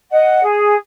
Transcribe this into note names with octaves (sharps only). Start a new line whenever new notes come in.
D#5 F#5
G#4